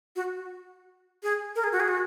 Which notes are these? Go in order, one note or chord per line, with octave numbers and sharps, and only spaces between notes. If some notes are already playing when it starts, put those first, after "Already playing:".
F#4
G#4
A#4
G#4
F#4
G#4
F#4